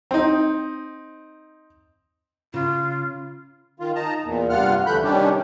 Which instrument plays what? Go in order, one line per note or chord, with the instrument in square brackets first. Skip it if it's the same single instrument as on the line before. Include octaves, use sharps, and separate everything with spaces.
[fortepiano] C4 D#4
[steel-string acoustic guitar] C#3 [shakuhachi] F4
[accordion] D#3 F4
D#4 A5 A#5
E2 A#2
G2 C3 F4 F#5 F6
D2 E3 A3 B5 F#6 G6
C3 D#3 G3 C#4 D4 G4